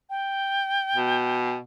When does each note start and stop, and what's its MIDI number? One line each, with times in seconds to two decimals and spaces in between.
0.10 1.57 79
0.95 1.58 47